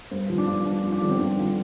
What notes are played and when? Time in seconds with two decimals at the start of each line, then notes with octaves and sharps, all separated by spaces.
0.11 G2 C5
0.29 F3 F4
0.38 D4
0.47 G2 F4
0.65 F3 D4
0.83 G2 F4
0.92 D4
1.01 D3 F3 F4
1.10 C4
1.19 G2 D4
1.38 D3 F3